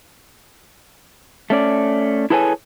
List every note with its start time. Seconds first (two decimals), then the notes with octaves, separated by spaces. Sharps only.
1.50 A3 C#4 D5
2.30 E4 G#4 A4 B4 C#5 G#5